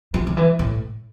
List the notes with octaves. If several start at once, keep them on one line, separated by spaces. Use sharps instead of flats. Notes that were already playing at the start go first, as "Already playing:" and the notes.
F3
D3
E3
A2